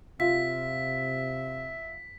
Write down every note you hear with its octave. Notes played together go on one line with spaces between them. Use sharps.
C3 F4 E5 B6